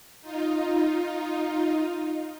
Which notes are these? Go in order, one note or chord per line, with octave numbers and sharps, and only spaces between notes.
D#4 F4